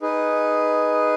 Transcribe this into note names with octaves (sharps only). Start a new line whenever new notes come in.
D#4 G#4 B4